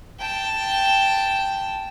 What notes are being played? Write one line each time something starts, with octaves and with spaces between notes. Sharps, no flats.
G5 A5